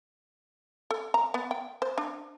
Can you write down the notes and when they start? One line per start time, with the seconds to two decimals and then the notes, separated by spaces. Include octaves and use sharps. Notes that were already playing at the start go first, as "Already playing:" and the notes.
0.91 A4
1.14 A#5
1.34 B3
1.51 G5
1.82 C5
1.98 D4